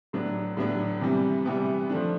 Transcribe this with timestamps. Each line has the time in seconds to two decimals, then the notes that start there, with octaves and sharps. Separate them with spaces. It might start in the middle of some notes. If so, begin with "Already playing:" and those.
0.13 A2 F#3 B3 D4
0.57 A2 F#3 B3 D4
1.01 C3 E3 G3 B3
1.45 C3 E3 G3 B3
1.90 F3 A3 D4